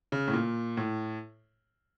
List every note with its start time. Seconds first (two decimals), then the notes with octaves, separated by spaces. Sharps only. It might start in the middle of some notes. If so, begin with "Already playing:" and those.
0.12 C#3
0.28 A2
0.33 A#2
0.77 A2